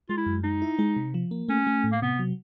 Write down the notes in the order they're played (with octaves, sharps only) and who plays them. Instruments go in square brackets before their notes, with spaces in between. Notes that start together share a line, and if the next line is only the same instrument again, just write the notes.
[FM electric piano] G#3 [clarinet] F4
[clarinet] E4
[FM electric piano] F#2
[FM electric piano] G#3 [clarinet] D#4
[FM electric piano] E4
G#3
C3
F3
A#3
[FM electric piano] A3 [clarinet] C#4
[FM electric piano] A3
A2
[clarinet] A#3
[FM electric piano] C3 [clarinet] B3
[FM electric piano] F#3